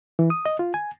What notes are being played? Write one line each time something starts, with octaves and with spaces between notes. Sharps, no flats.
E3
D#6
D#5
F4
G#5